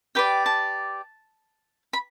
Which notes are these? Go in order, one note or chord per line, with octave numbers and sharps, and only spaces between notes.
G4 B4 D5 G5
A5
B5